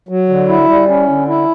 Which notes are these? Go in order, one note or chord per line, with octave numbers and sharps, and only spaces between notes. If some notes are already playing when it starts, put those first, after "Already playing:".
F#3
D3
E4
G3
C#4
D3
E4